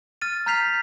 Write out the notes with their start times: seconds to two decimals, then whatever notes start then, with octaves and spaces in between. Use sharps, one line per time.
0.22 F6 A6 D#7
0.46 A#5 F6 G6 B6 C7 F7